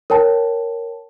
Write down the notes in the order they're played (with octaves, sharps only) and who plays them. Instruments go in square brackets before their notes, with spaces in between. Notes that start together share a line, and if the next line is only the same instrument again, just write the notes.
[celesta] A#4 C#5 G5 A5